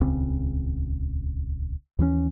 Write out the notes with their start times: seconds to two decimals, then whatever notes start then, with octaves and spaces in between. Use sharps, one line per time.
0.01 D#1 C#2 C#3 C4
1.99 D#2 E3 F#3 C#4